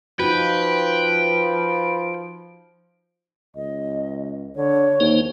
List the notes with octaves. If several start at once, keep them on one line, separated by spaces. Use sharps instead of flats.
F3 D#4 F4 F#4 B4 G5
C#2 D#5
D3 C#5
D#2 A#3 D#4 C5